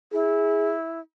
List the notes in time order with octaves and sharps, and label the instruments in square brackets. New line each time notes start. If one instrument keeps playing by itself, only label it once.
[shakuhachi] E4 [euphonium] G#4